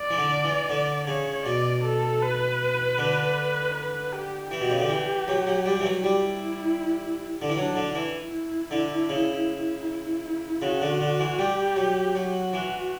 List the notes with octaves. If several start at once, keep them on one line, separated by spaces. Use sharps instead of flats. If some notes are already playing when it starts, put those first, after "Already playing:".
Already playing: D5
E3
D3
E3
D3 D5
C#3 C#5
B2 D5
A4
B4
D3
B4
G4
E3 G4
B2
C#3
D3
E3
F#3
F#3
G3
E3
F#3
G3 E4
D3
E3
F#3 D4
D3
E3 E4
E4
D3
C#3
E4
C#3 F#4
D3
D3
E3
G3 G4
F#3
F#3 F#4
E3